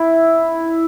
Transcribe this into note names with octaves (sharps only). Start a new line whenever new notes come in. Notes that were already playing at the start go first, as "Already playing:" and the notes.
Already playing: E4